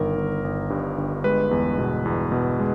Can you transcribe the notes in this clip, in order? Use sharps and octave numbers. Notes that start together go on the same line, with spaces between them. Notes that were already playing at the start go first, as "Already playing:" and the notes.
Already playing: G1 D#3 A#4
G1
G1
G2
G1
G#3 B4
E2
B2
E2
B2
G#3